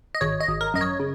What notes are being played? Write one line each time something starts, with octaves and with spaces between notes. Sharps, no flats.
D#5
G#1 C#5
D#5
G#1
A#4
F#2 D#5
C#5
C#3